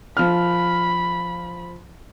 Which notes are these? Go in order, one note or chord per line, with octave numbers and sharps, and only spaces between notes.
F3 B5 F6